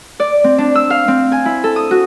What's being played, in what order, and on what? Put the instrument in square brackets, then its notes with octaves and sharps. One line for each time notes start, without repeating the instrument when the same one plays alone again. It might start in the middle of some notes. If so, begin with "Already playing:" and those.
[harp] D5
C4
D4
E6
F5
C4
G#5
E4
A4
D#6
F#4